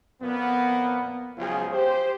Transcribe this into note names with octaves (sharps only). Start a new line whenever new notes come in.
F2 A#2 A#3 B3
C#2 F3 F#3 B3 F4 G#4
G4 C5